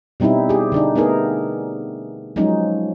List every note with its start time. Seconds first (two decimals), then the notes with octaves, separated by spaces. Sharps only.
0.20 B2 G3 C4 D#4 E4
0.49 G4 G#4
0.72 D3 D4 D#4
0.96 A3 B3 D#4 G#4 A#4
2.36 F3 F#3 G#3 C#4 D#4